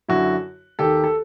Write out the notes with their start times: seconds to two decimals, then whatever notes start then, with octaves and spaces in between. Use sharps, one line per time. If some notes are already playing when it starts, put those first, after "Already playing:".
0.08 F#2 D3 E4 F#4
0.79 D#2 D#3 G4 A4
1.04 A4